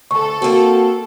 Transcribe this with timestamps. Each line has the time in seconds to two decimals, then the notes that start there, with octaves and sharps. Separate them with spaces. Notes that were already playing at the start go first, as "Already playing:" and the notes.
0.11 D2 A4 C#6
0.42 A#3 C4 F#4